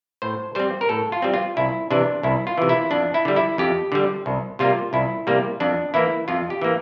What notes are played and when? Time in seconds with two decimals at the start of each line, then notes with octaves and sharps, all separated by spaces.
0.22 A2 C5
0.55 G3 C4 C5
0.81 A#4
0.89 A2 A4
1.12 F4
1.22 G3 C4
1.34 F4
1.57 C2 E4
1.90 C3 E3 D4
2.23 C2 E4
2.47 F4
2.58 C3 E3
2.69 E4
2.91 F2 D4
3.14 E4
3.25 D3 G3
3.36 E4
3.58 F2 G4
3.92 D3 G3
4.26 C2
4.59 C3 G3 A#3 F4
4.93 C2 E4
5.27 C3 G3 A#3
5.60 F2 D4
5.94 E3 A#3 E4
6.28 F2 F4
6.50 G4
6.62 E3 A#3